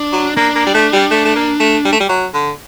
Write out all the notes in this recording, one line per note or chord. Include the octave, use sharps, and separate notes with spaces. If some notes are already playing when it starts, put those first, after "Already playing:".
Already playing: D4
F#3
A#3 D4
A#3
G3
A3
G3
A3
A3
A#3
A3
G3
A3
G3
F#3
D3